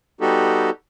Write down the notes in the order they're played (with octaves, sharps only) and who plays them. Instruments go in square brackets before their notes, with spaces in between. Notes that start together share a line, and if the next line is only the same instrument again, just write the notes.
[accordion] G3 B3 D#4 F#4 G4 A4